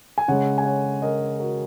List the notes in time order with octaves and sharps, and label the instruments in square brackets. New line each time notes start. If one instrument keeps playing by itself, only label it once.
[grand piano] G#5
C#3 G#3 C#5 F#5
G#5
C#5 F#5
A#4 D#5
F#4 A#4